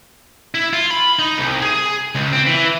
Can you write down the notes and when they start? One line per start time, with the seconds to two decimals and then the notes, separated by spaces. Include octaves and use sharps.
0.54 E4
0.73 F4
0.91 B5
1.19 D#4
1.38 C2
1.62 G#4
2.15 C#2
2.33 C4
2.46 E3